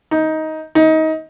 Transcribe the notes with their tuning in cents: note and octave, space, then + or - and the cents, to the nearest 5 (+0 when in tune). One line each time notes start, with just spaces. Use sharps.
D#4 +15
D#4 +25